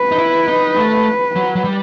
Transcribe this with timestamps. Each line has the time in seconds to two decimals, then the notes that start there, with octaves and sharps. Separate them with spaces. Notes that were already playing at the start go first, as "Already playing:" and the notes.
Already playing: B4
0.12 D#4
0.18 E4
0.48 D#4
0.76 A3
1.36 F#3
1.55 F#3
1.64 G3